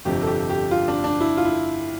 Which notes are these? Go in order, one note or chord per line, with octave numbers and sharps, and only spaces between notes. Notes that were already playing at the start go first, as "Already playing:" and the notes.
G1 F2 C3 F3 G4
A4
G4
G4
F4
D4
D4
E4
F4
E4